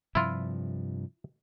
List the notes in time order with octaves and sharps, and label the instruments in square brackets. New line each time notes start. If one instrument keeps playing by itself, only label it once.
[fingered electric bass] G2 C3 F3 [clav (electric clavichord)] E4 F4